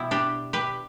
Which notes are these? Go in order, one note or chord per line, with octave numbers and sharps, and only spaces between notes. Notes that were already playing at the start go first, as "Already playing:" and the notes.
Already playing: B2 G3 B3 E4
D4 G4
G4 B4